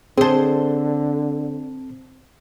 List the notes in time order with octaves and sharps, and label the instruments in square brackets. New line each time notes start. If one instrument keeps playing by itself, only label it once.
[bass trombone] D3 [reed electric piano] C4 A5 [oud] G#4 C5